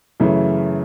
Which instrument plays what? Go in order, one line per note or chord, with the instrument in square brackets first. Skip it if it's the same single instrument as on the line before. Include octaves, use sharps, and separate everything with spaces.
[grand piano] F#2 C#3 E3 A3